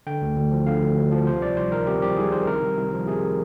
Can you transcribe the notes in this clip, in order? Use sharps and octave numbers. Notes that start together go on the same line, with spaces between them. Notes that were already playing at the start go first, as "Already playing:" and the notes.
D3 G5
D2
D2
F3
D3 F5
D2
D2
F3
C3 C5
C2 D5
C2 C5
D#3 A#4
C3 G4
C2 G4
C2 G#4
D#3 C5
C3 A#4
C2
C2
F3
C3 G#4